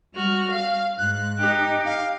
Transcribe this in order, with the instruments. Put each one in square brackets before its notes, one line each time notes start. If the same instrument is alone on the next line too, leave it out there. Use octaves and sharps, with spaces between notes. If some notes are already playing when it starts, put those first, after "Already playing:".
[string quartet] G3 F#4 F6
F5
[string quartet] G#2 [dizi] F#6
[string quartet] D#4 G4
[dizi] F5